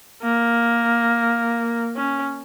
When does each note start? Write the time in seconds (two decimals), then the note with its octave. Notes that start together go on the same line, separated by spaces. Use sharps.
0.23 A#3
1.96 C#4